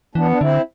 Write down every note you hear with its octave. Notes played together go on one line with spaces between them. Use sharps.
E3 B3 D4
D4
D3 C4 E4